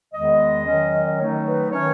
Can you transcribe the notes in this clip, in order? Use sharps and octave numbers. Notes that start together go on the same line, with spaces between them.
E2 D#3 G#3 B3 D#5
D#3 F#3 C#4
D#3 F#3 A3 D#4 C#5
B4
D#3 A3 C#4 C#5